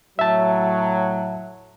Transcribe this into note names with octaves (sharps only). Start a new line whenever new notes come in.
A2 F#3 E5 A5